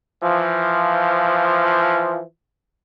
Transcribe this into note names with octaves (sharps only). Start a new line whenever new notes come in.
E3 F3